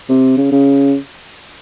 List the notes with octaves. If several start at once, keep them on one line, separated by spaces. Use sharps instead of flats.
C3
C#3
C#3